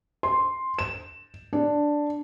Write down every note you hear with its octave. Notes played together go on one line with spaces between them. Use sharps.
C6
E7
D4